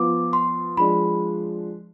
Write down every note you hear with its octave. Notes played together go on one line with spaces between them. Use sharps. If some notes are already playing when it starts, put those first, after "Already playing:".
Already playing: F3 B3 F4 D6
C6
F3 G#3 D4 B5